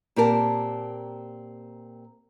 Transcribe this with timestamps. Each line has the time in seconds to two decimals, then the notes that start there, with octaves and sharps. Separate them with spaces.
0.16 A#2 C4 G4 A#4 A5